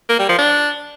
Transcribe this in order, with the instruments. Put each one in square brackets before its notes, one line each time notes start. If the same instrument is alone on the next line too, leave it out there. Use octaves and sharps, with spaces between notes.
[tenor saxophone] A#3
G3
F3
D4